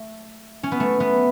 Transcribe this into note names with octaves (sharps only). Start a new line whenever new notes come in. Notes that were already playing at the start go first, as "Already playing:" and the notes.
Already playing: A3
C#4
B3
A3
B3